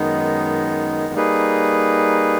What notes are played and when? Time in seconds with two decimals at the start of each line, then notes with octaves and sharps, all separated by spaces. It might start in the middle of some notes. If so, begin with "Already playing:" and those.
Already playing: F#2 D#3 G#3 B3 D#4
1.14 G3 A#3 D#4 G#4 B4